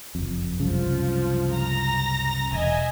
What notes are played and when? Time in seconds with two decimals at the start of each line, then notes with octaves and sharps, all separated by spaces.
0.15 F#1 F2
0.60 C2 F#2 C#3 F3
1.56 A#5 A#6
2.53 E1 D#5 E5 G#5